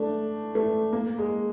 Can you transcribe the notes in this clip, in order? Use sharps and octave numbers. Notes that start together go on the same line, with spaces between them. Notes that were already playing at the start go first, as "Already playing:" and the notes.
Already playing: A3 D4
A3
A#3
G#3